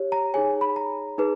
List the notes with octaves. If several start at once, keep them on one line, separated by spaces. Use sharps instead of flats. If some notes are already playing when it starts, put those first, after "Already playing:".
Already playing: G4 C#5
A#5
D#4 G#4 C#5 G#5
B5
A#5
D#4 G#4 B4